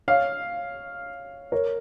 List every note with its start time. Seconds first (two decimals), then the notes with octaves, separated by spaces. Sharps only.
0.08 C#5 F5
1.52 A#4 C#5